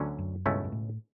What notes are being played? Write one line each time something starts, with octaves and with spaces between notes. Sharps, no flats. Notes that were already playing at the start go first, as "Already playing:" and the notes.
Already playing: D2 D3 F#3 C#4
F#2
C#2 G2 B2 A3 C#4 E4
G2
A2